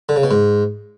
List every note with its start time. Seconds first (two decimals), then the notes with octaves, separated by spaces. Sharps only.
0.09 D3
0.16 C#3
0.23 B2
0.31 G#2